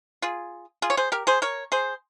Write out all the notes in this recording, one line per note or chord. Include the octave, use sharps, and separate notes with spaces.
F4 G#4
F4 G#4
C#5
G#4 C5
G4 A#4
G#4 C5
A#4 C#5
G#4 C5